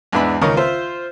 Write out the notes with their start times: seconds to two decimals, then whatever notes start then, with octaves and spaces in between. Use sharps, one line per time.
0.12 E2 G#2 B3 D4 E5 B5
0.42 C#2 D#3 C#4 A#4 C#6 D#6
0.57 F4 C5 E5